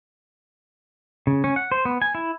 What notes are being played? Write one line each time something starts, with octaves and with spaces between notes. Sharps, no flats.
C#3
C#4
F#5
C5
B3
G#5
E4